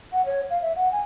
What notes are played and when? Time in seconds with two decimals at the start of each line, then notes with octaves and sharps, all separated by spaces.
0.13 F#5
0.26 C#5
0.50 F5
0.62 E5
0.76 F#5
0.92 G#5